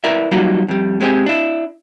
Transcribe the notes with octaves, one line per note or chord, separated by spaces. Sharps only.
E4 A#4 B4 D5 E5
F#3 G3 A#3 D#4 F4 F#4
F2 G3
G#3 C4 G4 G#4
D4 E4